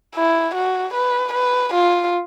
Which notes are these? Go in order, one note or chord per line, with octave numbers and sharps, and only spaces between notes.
E4
F#4
B4
B4
F4